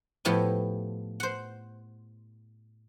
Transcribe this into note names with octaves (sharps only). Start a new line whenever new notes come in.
A2 F3 B3 E4 G4 D#5
C5 F#5